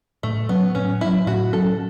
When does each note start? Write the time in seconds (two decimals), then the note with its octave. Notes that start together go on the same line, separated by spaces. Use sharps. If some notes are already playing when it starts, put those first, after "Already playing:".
0.23 A2 A3
0.49 F#3 B3 C#4
0.75 A2 C#4
1.01 F#3 C#4 E4
1.27 A2 F#4
1.53 F#3 C#4 A4